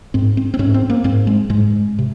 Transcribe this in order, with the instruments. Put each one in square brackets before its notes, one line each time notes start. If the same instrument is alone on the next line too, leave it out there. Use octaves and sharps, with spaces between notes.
[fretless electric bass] G#2 C4
C4
C4
G#2 C#4
C4
A#3
G#2 C4
G#3
G#2 G#3
C3